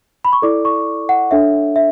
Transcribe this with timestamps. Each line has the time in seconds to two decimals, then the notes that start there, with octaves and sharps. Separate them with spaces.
0.25 B5
0.33 C#6
0.42 E4 A4 D5 D6
0.65 C#6
1.09 F#5
1.31 D4 A4 C#5 E5
1.76 E5